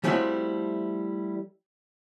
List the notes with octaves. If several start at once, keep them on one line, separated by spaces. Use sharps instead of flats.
F3 G3 A3 C4 E4 F#4